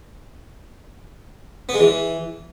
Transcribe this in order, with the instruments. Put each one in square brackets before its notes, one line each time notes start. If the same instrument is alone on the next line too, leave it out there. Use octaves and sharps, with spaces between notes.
[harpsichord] B3
G#3
E3